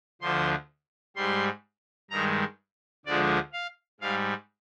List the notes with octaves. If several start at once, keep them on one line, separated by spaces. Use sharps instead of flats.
D2 D3 F3 C6
G#2 G3 C6
G2 D#3 G#3 A#5
D2 D3 F3 G#3 D5
F5
G#2 G3 F5